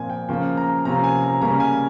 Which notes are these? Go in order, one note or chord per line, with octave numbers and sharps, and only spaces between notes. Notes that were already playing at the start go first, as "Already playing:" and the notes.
Already playing: A#2 F3 C4 G#5
G5
C#3 F3 A#3 C#4 G5
A#5
C3 F3 A#3 C#4 A#5
G#5
A#5
C#3 G3 A#3 C#4 A#5
G#5